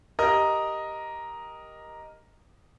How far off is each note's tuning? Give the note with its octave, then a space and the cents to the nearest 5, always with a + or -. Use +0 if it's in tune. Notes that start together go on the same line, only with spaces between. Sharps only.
G4 +0 A#4 +5 D#5 +0